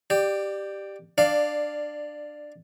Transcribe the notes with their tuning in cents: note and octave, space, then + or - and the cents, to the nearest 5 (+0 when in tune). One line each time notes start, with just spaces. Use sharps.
G4 +0 D5 +20 G5 +0
D4 +15 D5 +0 F5 +0